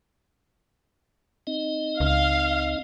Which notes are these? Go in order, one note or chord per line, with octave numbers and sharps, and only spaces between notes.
C4 D#4 D#5
C#2 F5